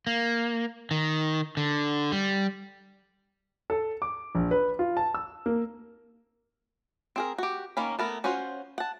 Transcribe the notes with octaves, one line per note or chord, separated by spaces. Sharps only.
A#3
D#3
D3
G3
A4
D6
A#1
B4
F4
A5
E6
A#3
C4 G#4 A#4
F#4 G4
D#3 A#3 C#4 B5
A3 B3 A#4
C#4 F4 F#4 C5
F#5 A5